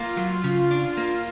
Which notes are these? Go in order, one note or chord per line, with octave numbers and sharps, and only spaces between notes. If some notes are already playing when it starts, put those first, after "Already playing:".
Already playing: A#3 F4
F#3
C#3
D4
A#3